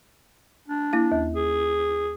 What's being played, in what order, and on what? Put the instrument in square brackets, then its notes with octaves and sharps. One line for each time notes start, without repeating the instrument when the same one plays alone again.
[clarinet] D4
[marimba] A#3 E4 F5
D#2
[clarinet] G#4